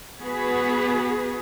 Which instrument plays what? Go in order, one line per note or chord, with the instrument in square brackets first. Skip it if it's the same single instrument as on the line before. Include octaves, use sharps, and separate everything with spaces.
[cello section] B3 F#4 G#4 B4